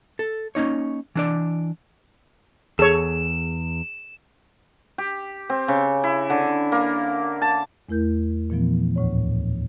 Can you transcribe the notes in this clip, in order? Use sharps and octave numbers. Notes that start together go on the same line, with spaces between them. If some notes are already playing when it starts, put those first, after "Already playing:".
A4
A#3 C#4 D#4 C#5
E3 D4 D5
E2 G#4 A4 C#5 E7
G4
C4
C#3
E4
D3
A#3
A5
E2 A3 E4 A#4 G6
A#2 E3 F3 B3
D2 A2 C#5